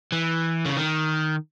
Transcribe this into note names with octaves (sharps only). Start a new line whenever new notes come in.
E3
C#3
D#3